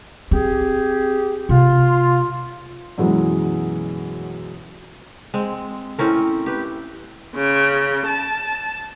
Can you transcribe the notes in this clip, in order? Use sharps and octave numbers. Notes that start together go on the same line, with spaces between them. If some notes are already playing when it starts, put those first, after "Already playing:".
C4 G4 G#4
C3 F4
F#2 B2 E3 F#3 G#3
G#3 C4
A2 C4 C#4 A#4
G4 B4
C#3
A5